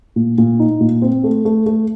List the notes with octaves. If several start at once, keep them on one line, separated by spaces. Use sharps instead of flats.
A#2
A#2
D#4
A#2
C4
A3
A3
A3